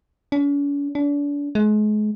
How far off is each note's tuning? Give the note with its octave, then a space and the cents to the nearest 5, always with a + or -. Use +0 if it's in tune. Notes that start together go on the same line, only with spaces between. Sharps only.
C#4 +45
D4 -35
G#3 +35